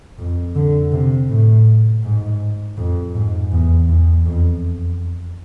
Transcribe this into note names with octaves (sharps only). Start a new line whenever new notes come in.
F2
D3
C3
A2
G#2
F2
G#2
E2
E2
F2